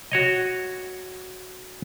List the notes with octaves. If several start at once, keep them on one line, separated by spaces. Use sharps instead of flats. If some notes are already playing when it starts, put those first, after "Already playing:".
F#4 C#5 D#5